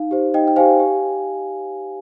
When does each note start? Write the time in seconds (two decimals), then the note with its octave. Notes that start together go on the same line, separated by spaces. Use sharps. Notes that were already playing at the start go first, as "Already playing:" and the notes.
Already playing: D#4 F5
0.11 G4 C5
0.34 D#4 D#5 G5
0.47 G5
0.56 G4 C5 F5 G#5
0.80 G4